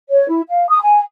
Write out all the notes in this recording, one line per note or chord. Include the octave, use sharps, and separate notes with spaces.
C#5
E4
F5
D#6
G#5